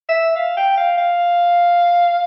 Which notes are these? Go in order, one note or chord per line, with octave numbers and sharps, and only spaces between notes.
E5
F5
G5
F5
F5